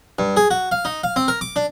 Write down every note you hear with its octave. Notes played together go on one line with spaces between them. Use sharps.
G2
G#4
F#4
F5
D#4
F5
C4
A#4
D6
D4